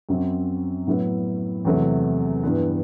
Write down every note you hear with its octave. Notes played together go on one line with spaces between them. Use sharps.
F#2 F#3 C4
A2 F#3 B3 E4
E2 C3 F#3 A3
G2 E3 B3